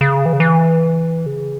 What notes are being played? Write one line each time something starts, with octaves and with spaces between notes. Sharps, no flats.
C#3
E3
C#3
E3
C#3